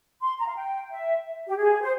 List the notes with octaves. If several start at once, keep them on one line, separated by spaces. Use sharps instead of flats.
C6
A#5
F5
G5
E5
G4
G#4
C5